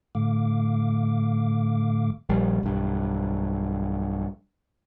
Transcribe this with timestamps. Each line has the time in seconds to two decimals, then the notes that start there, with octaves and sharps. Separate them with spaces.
0.15 A2 D3 A3 F5 D6
2.29 A#1 G3
2.63 B1 G2